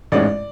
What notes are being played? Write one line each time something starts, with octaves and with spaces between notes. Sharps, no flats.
A1 G#2 G#3 C#4 D5